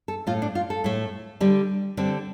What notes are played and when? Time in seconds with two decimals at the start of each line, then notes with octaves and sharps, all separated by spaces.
0.08 A4
0.27 A2 A3 F4
0.42 D4
0.55 F4
0.70 A4
0.84 A2 A3
1.41 D3 G3
1.97 D3 G3 C4